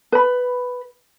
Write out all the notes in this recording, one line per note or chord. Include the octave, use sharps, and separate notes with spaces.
B4 B5